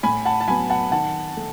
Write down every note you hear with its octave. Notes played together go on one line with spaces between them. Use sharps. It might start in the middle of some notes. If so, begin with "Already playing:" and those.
A2 G#5 B5
F#5 A5
A5
F#3 B3 G#5 B5
F#5 A5
D#3 F#5 A5
A3